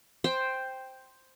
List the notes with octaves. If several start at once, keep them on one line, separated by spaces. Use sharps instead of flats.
C5 G5